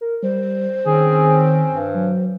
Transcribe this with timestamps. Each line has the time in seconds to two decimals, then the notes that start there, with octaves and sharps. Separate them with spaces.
0.01 A#4
0.23 G3 C5
0.86 D#3 C4 C#4 G#4
1.74 G2
1.95 F#3